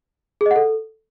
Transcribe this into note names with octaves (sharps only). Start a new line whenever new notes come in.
G#4
D#5
F#5
A4